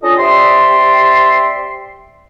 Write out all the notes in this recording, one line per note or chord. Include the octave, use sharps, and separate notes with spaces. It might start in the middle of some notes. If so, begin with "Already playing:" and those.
C#4 D4 F4 A4 D#5
C4 G4 D5 E5 C6